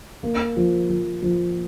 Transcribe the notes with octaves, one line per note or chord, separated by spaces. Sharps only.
A#3
F3
F3
F3